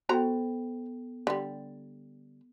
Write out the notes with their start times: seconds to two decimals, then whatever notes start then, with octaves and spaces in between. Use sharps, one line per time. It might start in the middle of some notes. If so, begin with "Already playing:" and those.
0.09 B3 F#4 A4 C5 G5 A#5
1.27 D3 G3